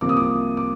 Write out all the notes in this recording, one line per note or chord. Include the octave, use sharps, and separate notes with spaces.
C2 C3 F3 A#3 D6
D#6
D6
D6